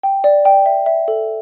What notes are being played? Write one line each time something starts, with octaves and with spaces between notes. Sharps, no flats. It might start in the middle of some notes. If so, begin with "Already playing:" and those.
G5
D5
G5
E5
E5
A4